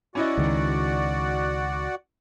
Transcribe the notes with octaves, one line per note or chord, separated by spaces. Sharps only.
C#4 E4 F#4 D5 D#5 F#5
C#2 D#3